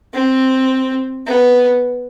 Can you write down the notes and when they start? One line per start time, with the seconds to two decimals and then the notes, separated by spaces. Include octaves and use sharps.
0.13 C4
1.26 B3